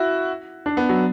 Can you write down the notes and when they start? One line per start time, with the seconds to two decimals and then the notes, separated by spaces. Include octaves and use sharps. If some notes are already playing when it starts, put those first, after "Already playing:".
Already playing: E4 F#4
0.66 D4
0.77 B3
0.89 F#3